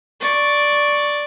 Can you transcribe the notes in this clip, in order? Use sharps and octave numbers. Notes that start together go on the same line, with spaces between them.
D5 C#6